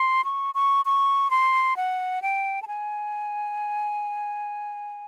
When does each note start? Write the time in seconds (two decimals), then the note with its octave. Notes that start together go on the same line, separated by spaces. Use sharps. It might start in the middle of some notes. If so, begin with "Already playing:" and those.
Already playing: C6
0.25 C#6
0.55 C#6
0.85 C#6
1.31 C6
1.77 F#5
2.22 G5
2.62 A5
2.68 G#5